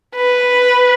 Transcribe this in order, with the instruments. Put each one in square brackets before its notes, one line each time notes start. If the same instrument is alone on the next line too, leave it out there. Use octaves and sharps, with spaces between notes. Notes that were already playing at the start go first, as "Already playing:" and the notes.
[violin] B4